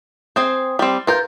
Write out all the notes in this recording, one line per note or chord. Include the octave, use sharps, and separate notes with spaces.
C4 G#4 C5 D#6
G3 C4
F4 A#4 B4 G6